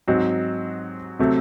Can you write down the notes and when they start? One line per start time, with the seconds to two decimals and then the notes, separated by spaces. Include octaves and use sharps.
0.08 G#2 F#3 C4 D#4
1.19 C3 F#3 A3 C4